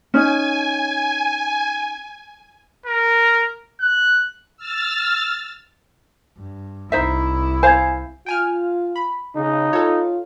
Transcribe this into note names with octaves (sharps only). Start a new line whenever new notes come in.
C#4 D#4 G#5
A#4
F#6
E6 F6 A6
G2
C2 D#4 E4 C5 E5
C5 F5 G#5 G#6
F4 G5 G#5 F6
B5
C#3 D#4
F4 A4 C#5